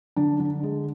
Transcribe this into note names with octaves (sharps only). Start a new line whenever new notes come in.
D3 D4
D3
G#3